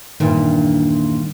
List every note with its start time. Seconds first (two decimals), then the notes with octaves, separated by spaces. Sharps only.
0.20 E2 G2 A#2 D#3